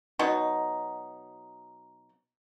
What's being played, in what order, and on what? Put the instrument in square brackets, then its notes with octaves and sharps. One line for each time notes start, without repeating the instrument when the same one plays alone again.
[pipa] B2 F#3 D#4